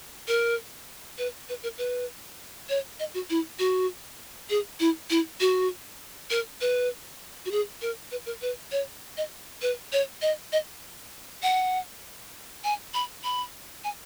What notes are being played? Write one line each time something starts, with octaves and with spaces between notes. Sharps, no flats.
A#4
B4
B4
A#4
B4
C#5
D#5
F#4
E4
F#4
G#4
E4
E4
F#4
A#4
B4
F#4
G#4
A#4
B4
A#4
B4
C#5
D#5
B4
C#5
D#5
D#5
F#5
G#5
B5
B5
G#5